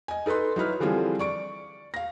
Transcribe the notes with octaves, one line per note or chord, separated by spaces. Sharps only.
D#5 G#5
D#4 A4 B4 D#5 C6
F#3 D#4 E4 B4 F6
D3 E3 F3 G3 C4 G#4
D5 C#6 D7
F5 A#6